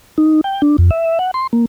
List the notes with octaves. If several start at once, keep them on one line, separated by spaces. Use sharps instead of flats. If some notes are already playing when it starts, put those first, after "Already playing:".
D#4
G5
D4
F2
E5
F#5
C6
A#3